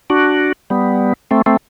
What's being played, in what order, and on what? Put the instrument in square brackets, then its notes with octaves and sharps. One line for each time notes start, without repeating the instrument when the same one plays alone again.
[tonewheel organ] D4 F#4
G3 B3
A3 C4
A3 C4